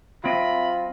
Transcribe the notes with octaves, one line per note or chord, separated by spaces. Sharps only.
F#3 C4 F4 D#5 E5 B5